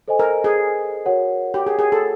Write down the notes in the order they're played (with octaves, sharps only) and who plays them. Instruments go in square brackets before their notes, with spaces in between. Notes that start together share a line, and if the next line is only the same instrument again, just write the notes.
[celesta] A4 C5 D#5 G#5
[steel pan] A#4
G#4
[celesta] F#4 A#4 C#5 F#5
[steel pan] G4
G#4
G#4
A4